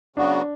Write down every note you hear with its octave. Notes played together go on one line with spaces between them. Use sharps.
C#3 F#3 B3 D4 F#4